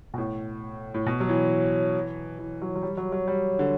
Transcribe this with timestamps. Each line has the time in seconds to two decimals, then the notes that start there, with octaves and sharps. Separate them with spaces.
0.14 B2
0.18 A2
0.94 A2
1.06 B2
1.20 F#3
1.29 E3
2.39 E3
2.62 F#3
2.69 E3
2.75 F#3
2.83 G3
2.97 F#3
3.12 F#3
3.28 G3
3.59 D3